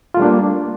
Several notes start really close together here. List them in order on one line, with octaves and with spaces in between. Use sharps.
F4 A3 G3 D4 A#3